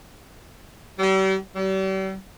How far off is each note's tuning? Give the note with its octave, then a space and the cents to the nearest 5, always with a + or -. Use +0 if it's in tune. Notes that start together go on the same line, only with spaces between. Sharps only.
G3 -40
G3 -40